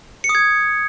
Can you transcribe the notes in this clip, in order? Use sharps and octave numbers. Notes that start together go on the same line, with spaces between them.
C#7
D#6
G#6